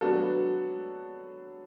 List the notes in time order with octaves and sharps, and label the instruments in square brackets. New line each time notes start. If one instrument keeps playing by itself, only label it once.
[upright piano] F#3 B3 D4 F#4 A4